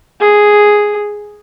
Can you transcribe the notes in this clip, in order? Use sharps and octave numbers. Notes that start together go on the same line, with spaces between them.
G#4